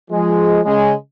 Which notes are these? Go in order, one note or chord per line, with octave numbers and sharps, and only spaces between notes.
F3 G#3
C#3 G#3